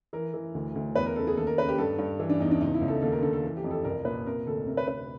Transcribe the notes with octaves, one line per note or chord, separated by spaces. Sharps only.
E3 A#4
E3
D2
D2
E2 B4
A#4
C#3 A4
G#4
D#2 A4
A#4
C#3 B4
G4
G2 A4
G2
E3
D4
E2 D#4
D4
C#2 D#4
E4
C#2
A4
D#2 A4
A#4
D3 A4
A4
E3
G4
F2
A4
C2 A#4
A#2 B4
C3 A#4
D2 A4
C3 A#4
B4
C3 B4